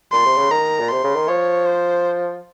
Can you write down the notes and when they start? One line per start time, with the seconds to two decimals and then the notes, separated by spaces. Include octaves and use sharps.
0.12 A#2 C6
0.25 C3
0.37 C#3
0.50 D#3 A#5
0.79 A#2
0.88 C3 C6
1.04 C#3
1.16 D#3
1.28 F3 C#5
1.66 C5